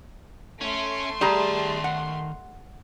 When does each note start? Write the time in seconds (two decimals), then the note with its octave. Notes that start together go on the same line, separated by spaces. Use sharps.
0.61 A3 C#4 C6
1.21 D#3 G3 G#4 A5 A#5
1.84 F#5